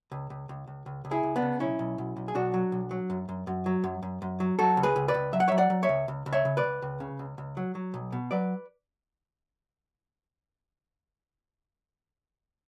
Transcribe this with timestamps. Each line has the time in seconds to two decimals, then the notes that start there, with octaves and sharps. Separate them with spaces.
0.12 C#2
0.30 C#2
0.49 C#2
0.68 C#2
0.86 C#2
1.05 C#2
1.11 E4 G#4
1.23 C#2
1.36 B3 D4
1.42 C#3
1.60 B1 C#4 E4
1.79 B1
1.98 B1
2.17 B1
2.28 G#4
2.35 B1 D4 F#4
2.54 F#3
2.72 B1
2.91 F#3
3.10 F#2
3.29 F#2
3.47 F#2
3.66 F#3
3.84 F#2
4.03 F#2
4.22 F#2
4.40 F#3
4.59 F#3 F#4 A4
4.77 C#2
4.83 G#4 B4
4.96 C#2
5.08 B4 D5
5.14 C#2
5.33 F#3 E5
5.40 F#5
5.48 F#3 C#5 E5
5.58 D5 F#5
5.70 F#3
5.83 C#5 E5
5.89 C#2
6.08 C#2
6.26 C#2
6.33 C#5 E5
6.45 C#3
6.57 B4 D5
6.64 C#2
6.82 C#2
7.00 C#3
7.19 C#2
7.38 C#2
7.57 F#3
7.75 F#3
7.94 B1
8.12 B2
8.31 F#3 B4 D5